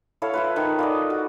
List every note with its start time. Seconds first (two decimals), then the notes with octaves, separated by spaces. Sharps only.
0.22 E4 A4 C#5 F5
0.33 E4 F4 B4
0.56 D#3
0.79 F4 D5 D#5
1.10 F#4